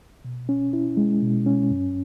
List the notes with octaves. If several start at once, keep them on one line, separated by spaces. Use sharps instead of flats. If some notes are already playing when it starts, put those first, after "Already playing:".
B2
C#4
E4
G#3
B2
C#4
F#2